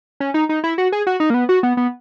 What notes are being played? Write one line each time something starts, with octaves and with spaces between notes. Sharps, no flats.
C#4
D#4
D#4
E4
F#4
G#4
F#4
D#4
A#3
B3
F#4
B3
B3